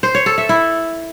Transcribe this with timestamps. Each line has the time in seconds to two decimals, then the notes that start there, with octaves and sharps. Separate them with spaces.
0.03 C5
0.15 C#5
0.26 A4
0.38 E5
0.49 E4